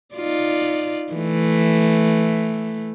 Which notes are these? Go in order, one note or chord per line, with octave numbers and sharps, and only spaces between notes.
D#4 F4 D5
E3 A3